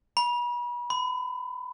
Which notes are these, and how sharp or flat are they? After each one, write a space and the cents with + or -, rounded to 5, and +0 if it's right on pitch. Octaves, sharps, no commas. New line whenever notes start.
B5 -35
B5 +35